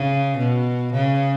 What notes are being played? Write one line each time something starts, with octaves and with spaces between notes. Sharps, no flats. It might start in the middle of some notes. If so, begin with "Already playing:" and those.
Already playing: C#3
B2
C#3